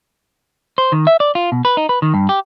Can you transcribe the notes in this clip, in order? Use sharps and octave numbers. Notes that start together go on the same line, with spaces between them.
C5
D#3
E5
D5
F4
B2
B4
D#4
B4
D#3
G2
G4